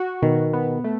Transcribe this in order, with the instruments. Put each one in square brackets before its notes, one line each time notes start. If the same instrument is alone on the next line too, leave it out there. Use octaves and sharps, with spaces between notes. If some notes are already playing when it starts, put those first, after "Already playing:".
Already playing: [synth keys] F#4
[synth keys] B2 [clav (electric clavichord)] D#3
[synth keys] B3
A3